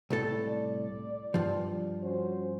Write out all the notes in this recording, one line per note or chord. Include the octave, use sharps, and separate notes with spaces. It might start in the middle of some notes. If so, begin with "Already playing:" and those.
C2 A2 A4
D5
G2 F3
C#4 F#4 C5